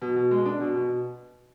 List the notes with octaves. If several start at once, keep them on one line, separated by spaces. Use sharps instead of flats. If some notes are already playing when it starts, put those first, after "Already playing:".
B2
B2
G#3
D4
B2
B2